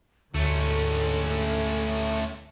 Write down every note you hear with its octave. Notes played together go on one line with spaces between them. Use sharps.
D2 G#2 D3 A3 C#4 A4